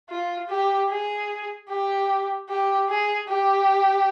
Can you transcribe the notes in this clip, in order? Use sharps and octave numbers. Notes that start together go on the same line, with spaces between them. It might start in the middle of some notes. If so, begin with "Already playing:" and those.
F4
G4
G#4
G4
G4
G#4
G4